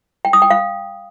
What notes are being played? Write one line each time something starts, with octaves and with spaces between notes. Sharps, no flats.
G5
D#6
G5
F5